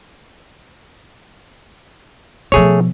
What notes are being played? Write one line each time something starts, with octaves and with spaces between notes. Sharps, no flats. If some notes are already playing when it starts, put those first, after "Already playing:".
B2 F3 A3 G#4 C#5